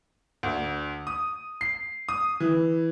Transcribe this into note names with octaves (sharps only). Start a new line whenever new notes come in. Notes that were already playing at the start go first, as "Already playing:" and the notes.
D2
D#6
C7
D#6
E3